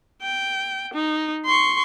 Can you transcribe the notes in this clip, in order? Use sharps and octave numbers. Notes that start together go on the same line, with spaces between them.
G5
D#4
C6 C#6